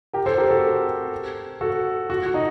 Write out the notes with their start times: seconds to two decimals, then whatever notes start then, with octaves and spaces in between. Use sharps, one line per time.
0.13 G4 A#4
0.26 A4 C5
0.38 G4 A#4
0.51 F#4 A4
1.61 F#4 A4
2.10 F#4
2.26 F#4
2.34 D#4